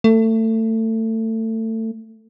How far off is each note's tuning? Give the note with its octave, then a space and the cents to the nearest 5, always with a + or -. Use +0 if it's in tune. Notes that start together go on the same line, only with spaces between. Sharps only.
A3 +25